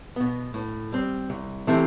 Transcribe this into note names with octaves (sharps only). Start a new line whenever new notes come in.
B2 B3
A2
G3 C4
C2
C3 E3 A3 C4